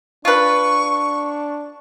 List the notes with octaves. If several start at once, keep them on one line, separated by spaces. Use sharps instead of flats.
D4 F4 B4 C#6